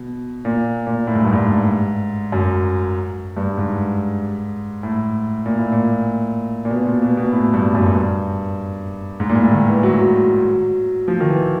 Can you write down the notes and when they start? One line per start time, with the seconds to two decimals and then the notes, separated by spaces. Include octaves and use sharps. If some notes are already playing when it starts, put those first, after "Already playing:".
Already playing: B2
0.45 A#2
0.87 A#2
1.07 A2
1.15 G#2
1.24 G2
1.32 G#2
2.32 F#2
3.37 G2
3.57 G#2
4.83 A2
5.46 A#2
5.58 A2
5.72 A#2
6.65 A#2
6.70 B2
6.86 A#2
7.02 B2
7.17 B2
7.32 A2
7.53 G2
7.75 F#2
7.95 G2
9.20 G#2
9.29 A#2
9.36 A2
9.52 D#3
9.68 E3
9.83 F#3
10.01 F#3
11.08 F3
11.20 D#3
11.28 E3